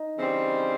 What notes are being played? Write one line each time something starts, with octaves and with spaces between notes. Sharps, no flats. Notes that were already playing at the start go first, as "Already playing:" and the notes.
Already playing: D#4
C#3 E3 G3 C4